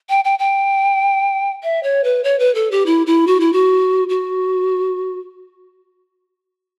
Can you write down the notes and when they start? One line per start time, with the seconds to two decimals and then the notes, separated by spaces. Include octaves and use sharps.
0.09 G5
0.25 G5
0.39 G5
1.63 E5
1.83 C#5
2.04 B4
2.24 C#5
2.39 B4
2.55 A4
2.71 G4
2.86 E4
3.07 E4
3.27 F#4
3.40 E4
3.53 F#4
4.09 F#4